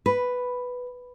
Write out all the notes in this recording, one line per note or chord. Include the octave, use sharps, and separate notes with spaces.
B4